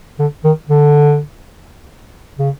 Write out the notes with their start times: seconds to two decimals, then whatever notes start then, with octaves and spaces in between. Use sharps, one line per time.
0.19 D3
0.44 D#3
0.69 D3
2.39 C#3